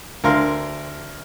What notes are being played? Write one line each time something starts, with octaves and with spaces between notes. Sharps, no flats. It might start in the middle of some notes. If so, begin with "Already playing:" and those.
D2 A#4 F5 C6